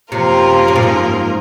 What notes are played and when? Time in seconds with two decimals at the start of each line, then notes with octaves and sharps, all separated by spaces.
0.12 F#2 C3 F3 A#3 F4 A#4
0.68 C3
0.76 A#2
0.83 G#2